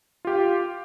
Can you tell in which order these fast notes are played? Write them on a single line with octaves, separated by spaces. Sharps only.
F4 G4 F5